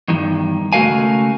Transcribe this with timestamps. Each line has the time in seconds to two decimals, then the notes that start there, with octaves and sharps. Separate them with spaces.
0.08 E2 G2 D#3
0.73 C#2 A3 F#4 A#4 F5 G#5